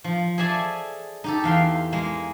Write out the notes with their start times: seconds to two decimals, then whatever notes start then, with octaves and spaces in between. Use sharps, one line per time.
0.04 F3
0.38 G#4 A4 D5 E5 G#5 A5
1.24 D#4 G4 A4
1.44 E2 F5 G5 C6
1.92 G#3 A#3